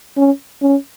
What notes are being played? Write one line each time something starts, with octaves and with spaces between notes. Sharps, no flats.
C#4
C#4